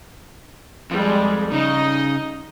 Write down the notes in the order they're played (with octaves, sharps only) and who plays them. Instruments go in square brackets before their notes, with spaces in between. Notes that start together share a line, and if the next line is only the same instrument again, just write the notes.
[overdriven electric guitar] F2 [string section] G3 G#3
[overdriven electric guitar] C#3 [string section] D#4 D#5